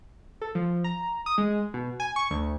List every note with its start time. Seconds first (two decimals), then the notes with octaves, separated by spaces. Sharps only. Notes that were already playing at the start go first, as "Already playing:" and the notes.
0.42 A4
0.55 F3
0.84 A#5
1.26 D#6
1.38 G#3
1.74 B2
2.00 G#5
2.16 C#6
2.31 D2